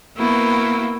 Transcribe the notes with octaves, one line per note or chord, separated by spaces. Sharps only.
A#3 B3 E4 F#4 G5